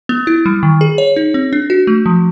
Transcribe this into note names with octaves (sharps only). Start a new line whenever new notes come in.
B3
E4
G3
D#3
G#4
C#5
D#4
C4
D4
F#4
A3
F3